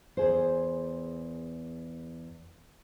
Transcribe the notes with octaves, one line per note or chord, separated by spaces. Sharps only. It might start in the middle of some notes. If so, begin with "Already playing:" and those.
E2 G#4 C5